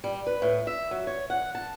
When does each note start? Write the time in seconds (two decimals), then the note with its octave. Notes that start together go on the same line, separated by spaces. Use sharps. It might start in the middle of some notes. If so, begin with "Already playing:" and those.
0.04 G3
0.27 B4
0.42 A2
0.67 E5
0.91 F#3
1.07 C#5
1.30 F#5
1.55 A5